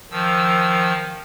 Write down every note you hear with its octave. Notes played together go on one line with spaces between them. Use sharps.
D#3 F3 E6